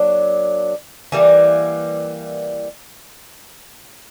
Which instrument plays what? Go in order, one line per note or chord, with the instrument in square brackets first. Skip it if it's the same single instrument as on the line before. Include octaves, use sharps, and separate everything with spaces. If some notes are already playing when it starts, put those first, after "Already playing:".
Already playing: [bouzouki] F#3 A#3 D4
E3 G3 A#3